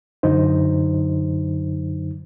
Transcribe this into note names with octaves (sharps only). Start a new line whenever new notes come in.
F#2 D3 F#3 D#4 C5